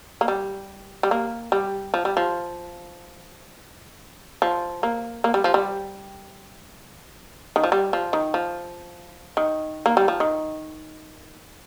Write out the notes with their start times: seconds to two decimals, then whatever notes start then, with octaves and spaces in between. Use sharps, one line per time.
0.21 A#3
0.28 G3
1.03 G3
1.11 A#3
1.52 G3
1.94 F3
2.05 G3
2.17 F3
4.42 F3
4.83 A#3
5.24 A#3
5.34 G3
5.44 F3
5.54 G3
7.56 D#3
7.64 F3
7.72 G3
7.93 F3
8.13 D#3
8.34 F3
9.37 D#3
9.86 A#3
9.97 G3
10.08 F3
10.20 D#3